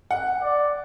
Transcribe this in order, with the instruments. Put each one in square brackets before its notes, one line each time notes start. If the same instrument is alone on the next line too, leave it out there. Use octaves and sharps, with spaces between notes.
[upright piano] F#5
[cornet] D5